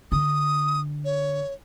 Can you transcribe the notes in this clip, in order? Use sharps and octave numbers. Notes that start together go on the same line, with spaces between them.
D3 D#6
C#5